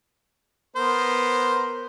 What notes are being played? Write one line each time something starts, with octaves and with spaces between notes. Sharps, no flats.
B3 A#4 C5